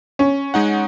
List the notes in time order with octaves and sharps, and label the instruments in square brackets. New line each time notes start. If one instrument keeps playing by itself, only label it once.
[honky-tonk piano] C#4
[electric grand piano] G#3 D#4 F#5